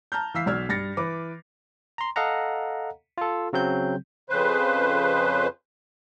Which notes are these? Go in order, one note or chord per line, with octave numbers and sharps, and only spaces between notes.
A5 A#5 F6 G6
E3 F5 E6 B6 C7
B1 F#4 D5 E6 F6 G#6
G2 A6 A#6 C#7
E3 B4 D6
A#5 C6
A4 D#5 F5 F#5 A#5
F4 A4
C#3 F#3 C4 G6
F2 C#3 B4 C5